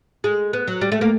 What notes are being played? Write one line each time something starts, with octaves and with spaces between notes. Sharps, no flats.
G#3
B3
F#3
G3
A3
A#3